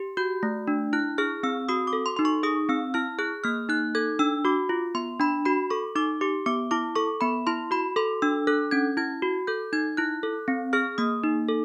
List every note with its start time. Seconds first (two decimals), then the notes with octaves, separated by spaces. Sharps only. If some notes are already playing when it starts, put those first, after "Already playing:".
Already playing: G4
0.17 F#4 G6
0.43 A3
0.68 D4
0.93 E4 F#6
1.18 G#4 F6
1.43 C4 E6
1.69 F#4 D#6
1.87 D6
1.93 A4
2.06 C6
2.17 D#4 C6
2.25 C#6
2.43 G#4 D#6
2.69 C4 E6
2.94 E4 F6
3.18 G#4 F#6
3.44 A#3 F6
3.69 D#4 F#6
3.95 A4 G#6
4.19 D4 E6
4.45 F#4 D6
4.69 F4
4.95 B3 C6
5.20 D4 B5
5.45 F#4 B5
5.70 A4 C#6
5.95 D#4 D6
6.21 G4 D6
6.46 B3 D6
6.71 E4 D6
6.96 A4 C#6
7.21 B3 B5
7.47 E4 C6
7.71 F#4 B5
7.96 A4 C6
8.22 D4 E6
8.47 A4 F#6
8.71 C#4 G#6
8.97 E4 G#6
9.22 F#4
9.47 A4 G6
9.73 D#4 G#6
9.97 E4 F#6
10.23 A4
10.48 C4
10.73 G#4 F6
10.98 A#3 D#6
11.24 D#4
11.49 A4